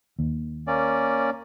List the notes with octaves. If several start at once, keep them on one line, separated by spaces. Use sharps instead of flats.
D#2
A#3 C#4 D5